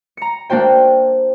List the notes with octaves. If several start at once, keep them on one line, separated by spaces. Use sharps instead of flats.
A#5 C#7
A#3 D4 F#4 C5 G5